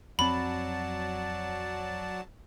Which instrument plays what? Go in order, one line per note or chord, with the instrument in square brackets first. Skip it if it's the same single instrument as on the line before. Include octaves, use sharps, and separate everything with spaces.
[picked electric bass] F2 C4 [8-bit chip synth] F#3 A5 [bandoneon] D5 F#5 [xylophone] B5